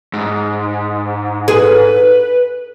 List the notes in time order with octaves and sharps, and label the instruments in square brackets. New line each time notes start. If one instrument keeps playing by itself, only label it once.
[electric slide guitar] G#2
[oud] G#4 [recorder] B4